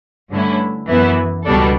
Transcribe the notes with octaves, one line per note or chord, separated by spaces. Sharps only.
G2 D3 A3 C#4 E4
F#2 E3 B3 E4
C#2 B2 G3 D4 A4